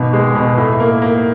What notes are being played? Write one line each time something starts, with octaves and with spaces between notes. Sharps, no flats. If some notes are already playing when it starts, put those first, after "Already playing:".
Already playing: G#1 B2
G#3
B2
A2
A#3
A#3